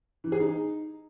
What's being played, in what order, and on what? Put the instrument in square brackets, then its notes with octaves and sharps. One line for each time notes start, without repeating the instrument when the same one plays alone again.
[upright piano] E3
G#4
D#4